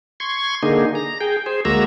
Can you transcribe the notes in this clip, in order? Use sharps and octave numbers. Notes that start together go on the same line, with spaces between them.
C6 C#6 G#6
D3 A#3 D#4 G#4
A#5
G#4 G5
G#4 C5
D2 G#3 A#3 F#4 A#5 E6